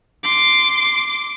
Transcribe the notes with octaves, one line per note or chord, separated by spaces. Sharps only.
C6 D6